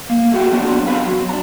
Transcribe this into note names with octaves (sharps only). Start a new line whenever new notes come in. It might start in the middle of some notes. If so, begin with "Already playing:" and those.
A#3
A3 F#4 G4 G5
F#3 B3 C4 D4 F4
B3 C4 G4 B4 F5
F#3
D4 A#5